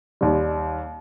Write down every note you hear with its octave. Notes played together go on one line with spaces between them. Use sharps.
D#2 D#3 G3